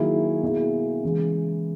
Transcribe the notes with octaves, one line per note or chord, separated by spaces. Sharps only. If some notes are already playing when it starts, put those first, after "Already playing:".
Already playing: D#3 F#3 A#3 E4 G#4
B2 A#3 E4 G#4
C#3 E3 G#3